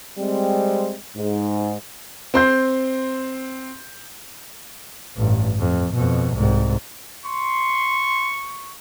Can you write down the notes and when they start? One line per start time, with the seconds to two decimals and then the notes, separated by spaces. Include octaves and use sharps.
0.18 G3 G#3 C4
1.17 G#2
2.34 C4 C6 G6
5.17 A1 G2
5.59 F2
5.94 F2 B2
6.34 C2 G#2
7.25 C6 C#6